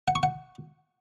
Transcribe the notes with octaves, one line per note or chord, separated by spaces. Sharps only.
F#5
C#6
F#5